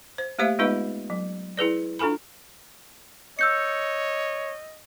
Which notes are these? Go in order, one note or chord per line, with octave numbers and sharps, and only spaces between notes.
C5
A3 A#3 G4 C5 E5 F5
G#3 B3 D#4 F4 B4 D#5
F#3
E4 G#4 B4 D5
D4 F4 A4 G#5 B5
C#5 D#5 E6 G6 C#7